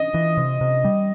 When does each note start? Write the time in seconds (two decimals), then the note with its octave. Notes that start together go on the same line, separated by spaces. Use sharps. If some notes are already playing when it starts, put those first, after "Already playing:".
Already playing: D#5
0.14 E3
0.37 C3
0.61 C3
0.85 G3